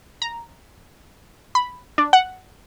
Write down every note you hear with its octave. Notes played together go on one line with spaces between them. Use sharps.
A#5
B5
D4
F#5